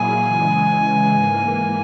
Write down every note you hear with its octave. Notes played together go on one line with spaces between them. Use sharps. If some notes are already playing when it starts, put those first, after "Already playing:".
Already playing: A#2 F#3 A#3 E4 G#4 G#5
C#3 E3 G#3
G#2 E3 A#3